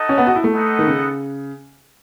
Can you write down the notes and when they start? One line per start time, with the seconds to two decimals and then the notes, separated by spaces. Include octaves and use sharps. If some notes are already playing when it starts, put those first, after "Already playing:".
Already playing: D#4 A4 D#5 F#5
0.09 C#4
0.18 B3
0.27 F#4
0.36 E4
0.44 A3
0.52 B3 D#4 A4 D#5 F#5
0.79 D#3
0.87 C#3